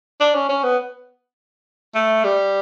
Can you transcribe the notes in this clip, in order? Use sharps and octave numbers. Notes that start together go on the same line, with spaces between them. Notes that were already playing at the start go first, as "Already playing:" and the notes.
D4
C#4
C#4
B3
A3
G3